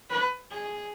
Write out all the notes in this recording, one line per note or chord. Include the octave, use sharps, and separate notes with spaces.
B4
G#4